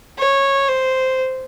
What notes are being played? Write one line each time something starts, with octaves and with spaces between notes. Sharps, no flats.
C#5
C5